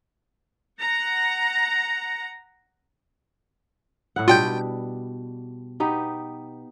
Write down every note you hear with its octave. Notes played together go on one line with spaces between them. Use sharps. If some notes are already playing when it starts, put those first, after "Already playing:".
F#5 A#5
A2 E4 F#5
B2 G3 D4 F4 G5 G6
B3 D#4 G4